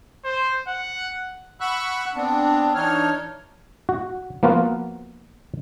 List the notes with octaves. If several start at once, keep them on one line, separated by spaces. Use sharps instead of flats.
C5
F#5
F#5 B5 C#6 E6 F#6
B3 C4 D4
E3 D4 D#4 C#5 F6
F#4
F3 A#3 B3 F4 F#4